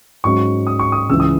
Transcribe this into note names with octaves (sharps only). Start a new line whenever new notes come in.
G#2 F#3 C#4 C#6
D#6
C#6
D#6
C#2 C#3 E3 E6
D#6